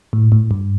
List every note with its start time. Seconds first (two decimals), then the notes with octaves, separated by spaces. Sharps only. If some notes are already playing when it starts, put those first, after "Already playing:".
0.13 A2
0.32 A2
0.51 G2